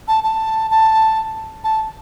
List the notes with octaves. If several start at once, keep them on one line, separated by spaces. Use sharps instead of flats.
A5
A5
A5
A5